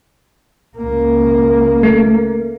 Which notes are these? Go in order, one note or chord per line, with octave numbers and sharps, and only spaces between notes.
C#2 A#3
A3